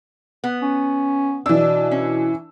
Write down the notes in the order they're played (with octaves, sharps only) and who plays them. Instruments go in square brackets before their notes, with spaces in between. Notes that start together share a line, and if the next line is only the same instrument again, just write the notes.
[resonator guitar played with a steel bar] B3
[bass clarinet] C#4
[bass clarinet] B2 [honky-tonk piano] E3 E6 [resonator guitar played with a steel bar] D4
[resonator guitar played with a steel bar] C#4